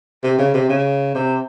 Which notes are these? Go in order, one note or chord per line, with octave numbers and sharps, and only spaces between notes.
C3
C#3
C3
C#3
C3